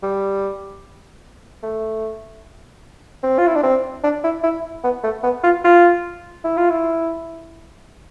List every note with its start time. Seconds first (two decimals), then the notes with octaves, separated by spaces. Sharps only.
0.03 G3
1.63 A3
3.23 C4
3.38 F4
3.47 E4
3.56 D4
3.63 C4
4.04 D4
4.24 E4
4.43 E4
4.84 B3
5.03 A3
5.23 B3
5.44 F4
5.64 F4
6.44 E4
6.57 F4
6.70 E4